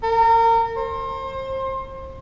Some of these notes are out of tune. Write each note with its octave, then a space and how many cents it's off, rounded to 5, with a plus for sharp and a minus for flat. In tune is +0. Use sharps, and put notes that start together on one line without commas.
A#4 -30
C5 +30